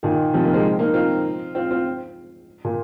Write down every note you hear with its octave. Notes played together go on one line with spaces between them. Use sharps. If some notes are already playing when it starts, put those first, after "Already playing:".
A#2 D#3
C3 F3
A#3 D#4
G#3 C4
A#3 D#4
C4 F4
C4 F4
C4 F4
A#2